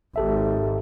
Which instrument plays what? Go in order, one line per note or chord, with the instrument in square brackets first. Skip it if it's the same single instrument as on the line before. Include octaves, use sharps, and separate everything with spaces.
[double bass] G#1 G#2 [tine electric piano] G4 A4 E5